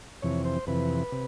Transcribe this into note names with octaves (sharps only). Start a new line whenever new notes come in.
F2 C3 E3 C#5
C5
F2 C3 E3 B4
C3